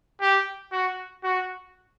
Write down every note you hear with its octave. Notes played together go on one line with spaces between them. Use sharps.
G4
F#4
F#4